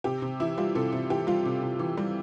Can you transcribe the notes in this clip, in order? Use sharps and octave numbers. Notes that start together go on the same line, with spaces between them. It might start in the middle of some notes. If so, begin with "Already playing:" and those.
C3 G4
C3
E3 E4
G3 F4
C3 A4
C3
E3 G4
G3 F4
C3
C3
E3
G3